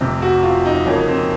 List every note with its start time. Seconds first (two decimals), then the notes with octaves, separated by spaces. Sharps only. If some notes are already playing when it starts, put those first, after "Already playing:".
0.01 F1 F2 C3
0.22 F#4
0.43 F4
0.65 D#4
0.86 F2 C#3 F3 A#3 C#4
1.08 C4